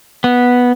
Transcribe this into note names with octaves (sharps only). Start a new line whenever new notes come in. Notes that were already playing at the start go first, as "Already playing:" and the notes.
B3